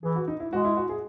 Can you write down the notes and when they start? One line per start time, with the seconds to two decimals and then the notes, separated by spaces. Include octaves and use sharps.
0.03 E3 G#4
0.16 F#4
0.28 D#4
0.40 E4
0.52 G#3 F#4
0.65 E4
0.77 F#4
0.89 G#4